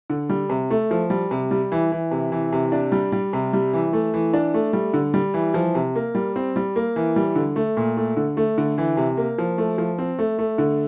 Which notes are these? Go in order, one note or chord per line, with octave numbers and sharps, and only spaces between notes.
D3
G3
C3
A3
F3
G3
C3
G3
E3
E3
C3
E3
C3
D4
G3
G3
C3
G3
E3
A3
E3
D4
A3
G3
D3
G3
E3
F3
C3
A#3
G3
C4
G3
A#3
E3
G3
D3
A3
A#2
A3
D3
A3
D3
E3
C3
A#3
F3
A3
F3
C4
A3
A3
D3